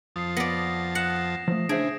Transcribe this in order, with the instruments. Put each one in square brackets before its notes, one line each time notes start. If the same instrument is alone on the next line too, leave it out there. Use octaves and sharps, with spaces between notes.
[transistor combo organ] F2 F3 A5 [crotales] D#6 C7
[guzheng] B3 D5 [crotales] A#6
[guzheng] F#5 [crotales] A#6 E7
[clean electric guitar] F3 A3
[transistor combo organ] C#3 E3 [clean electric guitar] D4 C5 E5 [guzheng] G#4 [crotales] D7